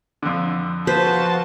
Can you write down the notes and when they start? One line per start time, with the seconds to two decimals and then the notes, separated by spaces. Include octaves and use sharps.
0.22 F2 D3
0.87 F3 F4 F#4 B4 C5 A5